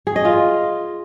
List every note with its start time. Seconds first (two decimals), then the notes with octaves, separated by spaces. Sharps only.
0.07 G#4
0.16 D#5
0.25 F4